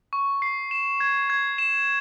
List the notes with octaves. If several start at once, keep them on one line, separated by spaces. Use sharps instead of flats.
C#6
C7
E7
G#6
G#6
E7